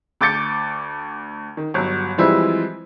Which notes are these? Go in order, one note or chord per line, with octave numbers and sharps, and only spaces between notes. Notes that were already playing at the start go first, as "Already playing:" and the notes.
D2 D6 G6 A6 C#7
D#3
G1 F#3
E3 F3 G3 G#3 C4 E4